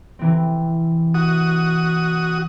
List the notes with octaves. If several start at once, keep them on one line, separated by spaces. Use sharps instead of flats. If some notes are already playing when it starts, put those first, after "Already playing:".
C3 E3 C4
F#4 D#6